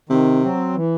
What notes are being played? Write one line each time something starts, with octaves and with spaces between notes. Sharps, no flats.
C3 D#3
F#3 C4
E3